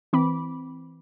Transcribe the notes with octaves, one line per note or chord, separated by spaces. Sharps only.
E3 C4 B5 D6